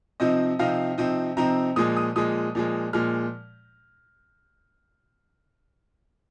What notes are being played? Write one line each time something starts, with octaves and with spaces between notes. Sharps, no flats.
C3 F3 C4 D#4 D#5
C3 F3 C4 D#4 F5
C3 F3 C4 D#4
C3 F3 C4 D#4 A#5
A#2 F3 G#3 D#6
D#6
A#2 F3 G#3 D#6
A#2 F3 G#3
A#2 F3 G#3 F6